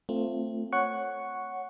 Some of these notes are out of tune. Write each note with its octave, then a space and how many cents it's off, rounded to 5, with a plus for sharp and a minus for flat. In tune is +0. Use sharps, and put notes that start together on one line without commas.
A3 +20 C4 +0 F4 +0
C#5 +0 F#5 +0 C#6 +0